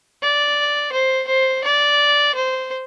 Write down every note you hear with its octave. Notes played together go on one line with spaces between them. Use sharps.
D5
C5
C5
D5
C5